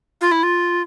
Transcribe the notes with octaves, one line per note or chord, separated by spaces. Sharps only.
F4
E4
F4